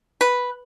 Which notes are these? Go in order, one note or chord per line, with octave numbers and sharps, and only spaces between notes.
B4